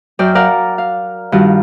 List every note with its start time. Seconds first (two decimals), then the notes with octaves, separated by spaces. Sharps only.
0.19 F#2 D5 G5 F6
0.35 A#4 D5 F5 F#5
0.78 F5
1.32 G2 D#3 F4 F#4 F#5